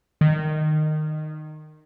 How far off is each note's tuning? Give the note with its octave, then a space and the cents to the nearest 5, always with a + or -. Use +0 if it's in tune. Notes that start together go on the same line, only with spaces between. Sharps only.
D#3 -15